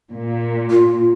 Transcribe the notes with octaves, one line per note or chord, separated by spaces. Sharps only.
A#2
F4